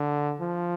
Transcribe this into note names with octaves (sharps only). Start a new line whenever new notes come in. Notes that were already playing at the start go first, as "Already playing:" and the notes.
Already playing: D3
F3